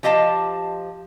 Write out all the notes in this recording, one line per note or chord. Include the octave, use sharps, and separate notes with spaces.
F3 G4 D#5 F5 A5